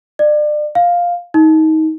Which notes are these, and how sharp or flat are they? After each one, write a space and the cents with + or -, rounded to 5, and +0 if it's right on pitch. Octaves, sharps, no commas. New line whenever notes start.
D5 +35
F5 +5
D#4 +25